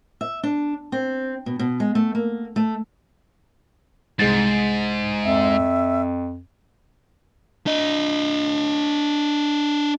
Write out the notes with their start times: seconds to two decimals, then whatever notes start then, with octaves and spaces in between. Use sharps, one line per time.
0.21 E5
0.43 D4
0.92 C4
1.46 B2
1.59 B2
1.80 G#3
1.95 A3
2.15 A#3
2.56 A3
4.19 C2 G#2 G#3 A6
5.24 F2 E5
7.67 D4 D#5